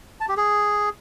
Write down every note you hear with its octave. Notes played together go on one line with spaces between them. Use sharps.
A5
G4
G#4